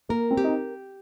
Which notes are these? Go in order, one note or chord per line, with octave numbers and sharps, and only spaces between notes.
A#3 A#4
C4
G4
D#4